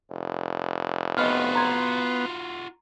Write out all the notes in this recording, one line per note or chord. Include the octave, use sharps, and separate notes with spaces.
F1
B3 F4 F#4 D#5 B5 F6
A#5 C6 G#6